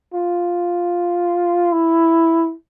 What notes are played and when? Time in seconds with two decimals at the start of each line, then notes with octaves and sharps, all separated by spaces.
0.14 F4
1.72 E4